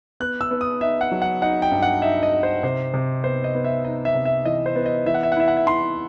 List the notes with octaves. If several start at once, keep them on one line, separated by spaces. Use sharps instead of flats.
B3 F#6
E6
B3
D#6
D#4 E5
F#5
F#3
F#5
D#4 F#5
G5
G2
F#5
D#4 E5
D#5
D#4
C5
C3 C5
C3
B3 C5
D#5
B3
E5
D#4 D#5
E5
C3
E5
E3 D#5
C5
B3
D#5
E3 E5
F#5
E5
F#5
E4 E5
F#5
E5
E4 C6